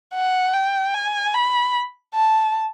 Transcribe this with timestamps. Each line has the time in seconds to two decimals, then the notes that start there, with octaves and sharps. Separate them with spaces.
0.14 F#5
0.54 G5
0.94 G#5
1.34 B5
2.14 A5